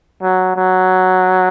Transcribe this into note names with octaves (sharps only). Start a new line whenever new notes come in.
F#3
F#3